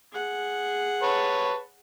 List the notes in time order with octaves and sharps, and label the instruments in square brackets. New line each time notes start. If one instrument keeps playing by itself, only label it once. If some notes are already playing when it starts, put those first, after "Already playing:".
[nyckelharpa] G#4 F#5
[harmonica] B4 C#5 A5